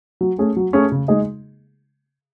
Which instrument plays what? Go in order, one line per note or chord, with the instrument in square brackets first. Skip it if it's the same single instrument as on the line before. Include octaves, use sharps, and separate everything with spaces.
[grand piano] F#3
A3 C#4 G#4
F#3
A3 C#4 G#4
C#3
G#3 D#4 G#4 D#5